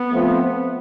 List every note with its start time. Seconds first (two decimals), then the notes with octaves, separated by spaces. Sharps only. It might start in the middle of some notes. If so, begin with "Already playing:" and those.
Already playing: B3
0.12 F3 A3 C4 F4